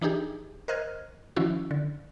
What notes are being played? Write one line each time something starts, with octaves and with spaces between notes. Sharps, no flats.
E3 D4 D#4 G4 G#4
A#4 C5 D#5 F6 F#6 G#6
D#3 F3 C#4 E4 F#4
D3